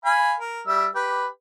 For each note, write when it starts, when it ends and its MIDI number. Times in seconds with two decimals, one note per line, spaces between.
0.05 0.34 77
0.05 0.34 80
0.05 0.34 83
0.40 0.62 70
0.67 0.86 55
0.67 0.86 76
0.67 0.86 88
0.95 1.27 67
0.95 1.27 71